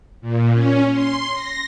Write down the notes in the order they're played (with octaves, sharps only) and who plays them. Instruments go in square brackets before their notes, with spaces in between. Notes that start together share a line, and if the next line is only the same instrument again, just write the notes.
[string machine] A#2
C#4
C6
A#6